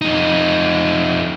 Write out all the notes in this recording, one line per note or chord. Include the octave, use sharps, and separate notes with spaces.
F2 D#4